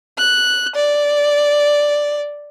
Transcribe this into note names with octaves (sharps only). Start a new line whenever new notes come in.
F#6
D5